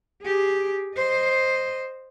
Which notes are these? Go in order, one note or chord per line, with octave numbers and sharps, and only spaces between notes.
G4 G#4
C5 D#5